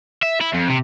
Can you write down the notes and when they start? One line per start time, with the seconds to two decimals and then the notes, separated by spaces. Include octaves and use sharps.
0.23 E5
0.41 E4
0.54 F2
0.69 C3